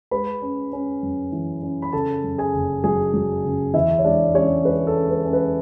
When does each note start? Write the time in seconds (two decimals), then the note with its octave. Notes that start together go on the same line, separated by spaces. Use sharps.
0.11 G#3 B4 B5
0.42 C#4
0.73 C#4
1.03 F#2
1.32 E3
1.63 C#4
1.82 B5
1.93 C#3 A4 A5
2.24 F#2
2.38 G#4 G#5
2.54 F#1
2.84 F#3 G#4 G#5
3.14 F#3
3.45 C#3
3.74 E2 E4 E5
3.99 C#5
4.04 G#3 D4 D5
4.34 G#3 C#4 C#5
4.65 G#3 B4
4.87 A4
4.95 C#4
5.10 B4
5.25 C#4
5.33 B4